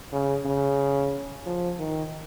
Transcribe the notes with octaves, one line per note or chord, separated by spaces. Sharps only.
C#3
C#3
F3
D#3